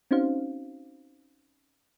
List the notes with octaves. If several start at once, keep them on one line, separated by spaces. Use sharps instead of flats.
C4 C#4 D#4 F#4 C5 F5